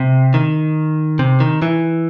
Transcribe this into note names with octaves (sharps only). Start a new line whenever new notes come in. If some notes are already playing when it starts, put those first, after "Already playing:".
Already playing: C3
D#3
C3
D#3
E3